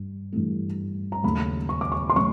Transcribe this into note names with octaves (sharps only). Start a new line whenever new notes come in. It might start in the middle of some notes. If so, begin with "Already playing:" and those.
Already playing: G2
G2 E3 A3
A#5
D#2 C#3 F#3 A3 B5
C#6
D6
C#6
C6
C#3 F#3 A3 C#6